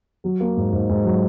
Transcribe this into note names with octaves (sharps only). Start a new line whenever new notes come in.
F#3
A#3
G#2
G#2
G#2
F#3